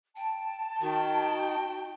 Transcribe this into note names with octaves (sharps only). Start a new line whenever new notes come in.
G5 A5
D#3 F#4 G5